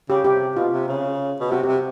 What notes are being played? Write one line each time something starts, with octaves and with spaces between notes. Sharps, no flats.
C#3 G4
C3 G4
B2 F4
C3
C#3
B2
C3 F#4
C3 G4